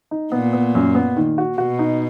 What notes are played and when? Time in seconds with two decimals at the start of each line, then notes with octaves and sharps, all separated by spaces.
0.11 D#4
0.32 A#2 B3
0.53 B3
0.75 F#2
0.95 B3
1.17 D#3
1.38 F#4
1.58 B2 F#4
1.79 D#4